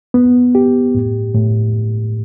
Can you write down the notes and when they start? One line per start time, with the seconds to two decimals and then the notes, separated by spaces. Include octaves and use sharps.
0.14 B3
0.55 G4
0.95 A2
1.35 A2